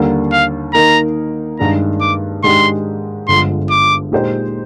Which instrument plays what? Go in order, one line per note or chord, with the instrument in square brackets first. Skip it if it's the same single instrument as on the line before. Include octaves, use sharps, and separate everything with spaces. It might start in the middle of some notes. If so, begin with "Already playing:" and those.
Already playing: [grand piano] D#2 D3 G3 A#3
[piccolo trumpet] F5
[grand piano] D#3 A#3 D#4 A#4 [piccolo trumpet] A#5
[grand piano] G2 D#3 G#3 D4 [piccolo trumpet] A#5
[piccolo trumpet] D6
[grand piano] G#2 D#3 G#3 D4 G4 [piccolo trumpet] C6
[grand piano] G1 G2 D3 F3 G#3 [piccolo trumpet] C6
[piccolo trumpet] D6
[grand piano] A#2 G#3 D#4 G4 C5